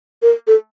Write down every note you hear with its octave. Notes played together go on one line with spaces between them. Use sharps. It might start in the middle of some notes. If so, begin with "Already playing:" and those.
A#4
A4